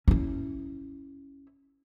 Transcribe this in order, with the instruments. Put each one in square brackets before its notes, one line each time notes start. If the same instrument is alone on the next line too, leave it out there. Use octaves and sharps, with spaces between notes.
[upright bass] C#4 E4